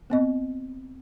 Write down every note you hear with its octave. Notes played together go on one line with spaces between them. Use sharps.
B3 C4 D#5